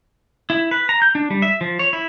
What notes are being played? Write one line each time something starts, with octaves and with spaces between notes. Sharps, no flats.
E4
B4
A#5
G6
D4
G3
E5
F3
C#5
E4